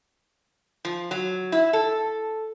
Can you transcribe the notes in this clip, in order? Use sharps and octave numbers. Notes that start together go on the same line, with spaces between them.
F3
F#3
E4
A4